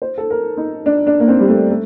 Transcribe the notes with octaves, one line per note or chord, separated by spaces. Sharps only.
C5
A4
A#4
D#4
D4
D4
A#3
C4
G3
A3
A3